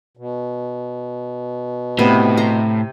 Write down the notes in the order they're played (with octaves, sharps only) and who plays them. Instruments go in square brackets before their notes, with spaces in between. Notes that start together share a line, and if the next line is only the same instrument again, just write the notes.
[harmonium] B2
[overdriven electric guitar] A2 [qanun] C3 B3
[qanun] A#5 C6